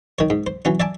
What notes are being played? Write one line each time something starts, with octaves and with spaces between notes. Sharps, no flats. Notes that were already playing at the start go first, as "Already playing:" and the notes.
D#3 C#5
G#2
C5
E3 F#3 C#4
D5 E5 G#5 A5 D6